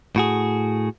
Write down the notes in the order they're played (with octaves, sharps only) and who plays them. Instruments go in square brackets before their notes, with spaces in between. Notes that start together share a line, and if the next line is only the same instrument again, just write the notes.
[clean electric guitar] A2 F#4 G#4